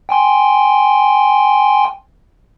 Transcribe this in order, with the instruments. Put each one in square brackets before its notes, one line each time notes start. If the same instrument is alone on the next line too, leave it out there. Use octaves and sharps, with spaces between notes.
[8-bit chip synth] G5 G#5 C6